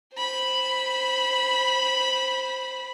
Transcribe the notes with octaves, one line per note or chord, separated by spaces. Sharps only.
C5 B5